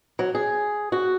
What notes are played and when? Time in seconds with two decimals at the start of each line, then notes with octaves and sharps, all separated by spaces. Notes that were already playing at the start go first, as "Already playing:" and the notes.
0.19 F#3
0.35 G#4
0.92 F#4